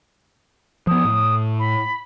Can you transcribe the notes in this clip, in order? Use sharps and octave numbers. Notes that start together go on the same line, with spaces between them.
F3 B3 D#6
A2
B5